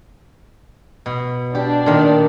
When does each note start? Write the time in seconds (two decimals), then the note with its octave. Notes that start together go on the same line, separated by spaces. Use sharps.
1.06 B2
1.55 D4 G4
1.86 A#2 D#3